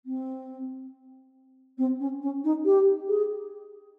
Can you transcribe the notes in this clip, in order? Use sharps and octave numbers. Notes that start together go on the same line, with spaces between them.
C4
C4
C#4
C#4
D#4
G4
G#4